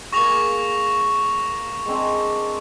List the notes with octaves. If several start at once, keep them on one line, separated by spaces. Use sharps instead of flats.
A#3 G#4 C#6 A#6 F7
G#3 C4 D4